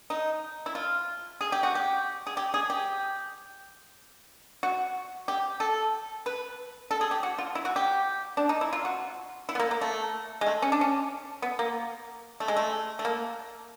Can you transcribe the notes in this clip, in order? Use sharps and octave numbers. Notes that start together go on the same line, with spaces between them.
D#4
E4
F4
G#4
G4
F#4
G4
G#4
G4
G#4
G4
F#4
G4
A4
B4
A4
G#4
G4
F#4
F4
E4
F#4
G4
D4
D#4
E4
F4
F#4
E4
B3
A#3
A#3
A3
G#3
A3
C#4
D4
C#4
B3
A#3
A3
G#3
A3
A3
A#3